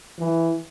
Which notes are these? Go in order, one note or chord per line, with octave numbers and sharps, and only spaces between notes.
E3